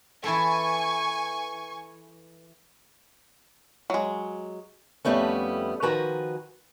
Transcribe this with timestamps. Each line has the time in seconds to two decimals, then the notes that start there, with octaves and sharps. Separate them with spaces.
0.24 E3 E4 A4 G#5 C#6
3.90 F#3 G#3
5.05 F2 D#3 G3 A3 B3 C#4
5.82 D#3 F3 F#4 B4 G#5 A#5